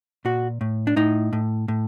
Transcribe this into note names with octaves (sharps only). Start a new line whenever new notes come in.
A#2 F#4
A2
D4
A2 D#4
A2
A2